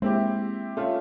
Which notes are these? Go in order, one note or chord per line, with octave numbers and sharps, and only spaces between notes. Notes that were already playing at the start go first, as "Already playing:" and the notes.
G#3 A#3 C4 E4 G4
A3 C#4 F4